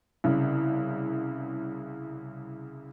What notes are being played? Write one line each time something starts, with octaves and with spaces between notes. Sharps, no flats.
C2 C#3